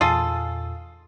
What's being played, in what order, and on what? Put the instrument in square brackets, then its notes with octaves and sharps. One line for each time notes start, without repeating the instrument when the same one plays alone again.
[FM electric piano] E2 A#2 [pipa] F4 G#4 A4